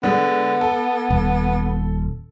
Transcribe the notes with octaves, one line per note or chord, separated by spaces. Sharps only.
D3 G#3 B3
A4
D#1